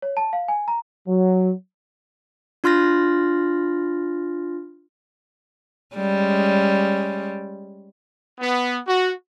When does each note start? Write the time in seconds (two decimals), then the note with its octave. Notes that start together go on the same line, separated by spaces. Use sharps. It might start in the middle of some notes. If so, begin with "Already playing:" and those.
0.02 C#5
0.17 A5
0.33 F5
0.48 G#5
0.68 A#5
1.07 F#3
2.64 D4 F4 C6 F6 A6 A#6
5.96 G3 G#3 C#4
8.40 B3
8.88 F#4